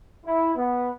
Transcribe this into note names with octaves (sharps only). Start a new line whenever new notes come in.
E4
B3